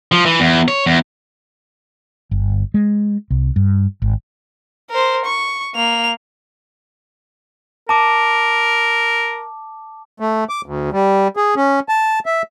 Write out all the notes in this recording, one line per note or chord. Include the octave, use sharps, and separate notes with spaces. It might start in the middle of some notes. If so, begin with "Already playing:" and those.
F3
E3
E2
C#5
E2
G1
G#3
C2
G2
G#1
A#4 C5
C#6
A#3 F7
A#4 A5 D6
A3
D6
D2
G3
G#4
C#4
A5
E5